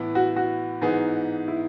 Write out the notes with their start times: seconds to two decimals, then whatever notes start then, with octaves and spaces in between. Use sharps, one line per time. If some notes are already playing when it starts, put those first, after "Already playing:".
Already playing: A2 E3 B3 E4
0.15 F#4
0.36 F#4
0.81 G#2 E3 B3 D#4 G#4
1.48 E4